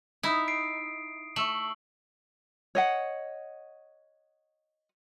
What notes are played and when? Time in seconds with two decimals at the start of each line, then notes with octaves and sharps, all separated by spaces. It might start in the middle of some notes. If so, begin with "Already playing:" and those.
0.23 D#4 E4 D#6
0.48 C7 D7
1.36 A3 C#6 E6 F#7
2.75 C#5 D#5 F#5